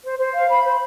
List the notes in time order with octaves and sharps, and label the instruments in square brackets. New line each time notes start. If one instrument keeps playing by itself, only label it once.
[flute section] C5
C5
F5
B5
C5